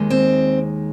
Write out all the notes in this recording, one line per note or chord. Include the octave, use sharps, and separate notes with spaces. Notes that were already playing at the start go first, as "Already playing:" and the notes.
Already playing: D#2 D#3 G#3
C4